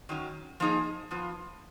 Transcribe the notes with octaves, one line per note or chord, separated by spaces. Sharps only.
D#3 F#3 C#4
F3 A#3 D#4 G#4
F3 B3 F4